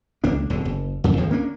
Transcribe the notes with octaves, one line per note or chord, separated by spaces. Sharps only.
C#2 A#3 D4
D1 B2 D3
F#1
D#1 F2 C#3
G#1 D#2 A2 F3
A#3 C#4 D4